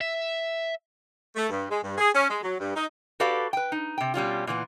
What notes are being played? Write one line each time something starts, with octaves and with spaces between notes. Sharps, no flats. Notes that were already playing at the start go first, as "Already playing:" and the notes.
E5
A3
G2
G#3
G2
G#4
C#4
G#3
F#3
G2
D#4
F#4 G4 A4 B4 D5 F5
B4 G5
D#4
C3 G5
B2 G3 C#4 F4
A#2 E3 B3